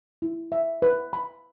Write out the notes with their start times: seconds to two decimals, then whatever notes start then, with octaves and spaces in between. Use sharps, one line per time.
0.22 E4
0.52 E5
0.82 B4
1.13 B5